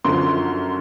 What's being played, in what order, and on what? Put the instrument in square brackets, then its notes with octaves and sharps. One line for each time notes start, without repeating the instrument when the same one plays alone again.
[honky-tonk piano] F#2 D3 F3 C6